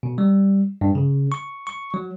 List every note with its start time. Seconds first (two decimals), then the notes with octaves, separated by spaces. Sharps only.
0.03 B2
0.18 G3
0.81 G2
0.95 C#3
1.32 C#6
1.67 C#6
1.94 F#3